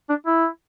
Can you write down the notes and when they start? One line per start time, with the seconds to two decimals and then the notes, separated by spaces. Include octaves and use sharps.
0.09 D4
0.26 E4